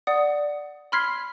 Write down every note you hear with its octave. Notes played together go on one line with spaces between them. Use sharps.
D5 F#5 D#6
B5 C6 F6 G#6 B6 C7